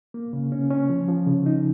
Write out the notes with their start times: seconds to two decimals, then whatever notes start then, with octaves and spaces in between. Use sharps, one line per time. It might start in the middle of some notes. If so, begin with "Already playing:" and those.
0.14 A#3
0.33 C#3
0.52 C#4
0.70 C#4
0.90 F3
1.08 F3
1.26 C#3
1.46 D#4